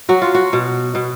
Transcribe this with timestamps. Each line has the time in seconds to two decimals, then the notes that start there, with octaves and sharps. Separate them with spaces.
0.09 F#3 F#4
0.22 F4
0.35 F#4
0.53 B2
0.95 B2